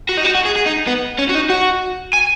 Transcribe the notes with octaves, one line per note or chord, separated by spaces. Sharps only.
F#4
D#4
F#4
F#4
G#4
G#4
D#4
B3
C#4
F#4
D#4
F#4
G#5